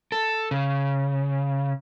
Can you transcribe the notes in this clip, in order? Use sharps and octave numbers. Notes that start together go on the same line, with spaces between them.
A4
C#3